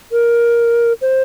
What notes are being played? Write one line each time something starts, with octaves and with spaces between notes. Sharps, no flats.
A#4
C5